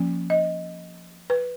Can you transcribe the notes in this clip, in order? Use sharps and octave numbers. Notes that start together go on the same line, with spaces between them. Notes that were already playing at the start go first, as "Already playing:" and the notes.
Already playing: F3 A#3 C#4
D#5
B4